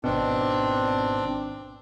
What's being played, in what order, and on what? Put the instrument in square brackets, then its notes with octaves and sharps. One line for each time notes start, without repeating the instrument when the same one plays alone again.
[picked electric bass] G#1 B2 [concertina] C4 D4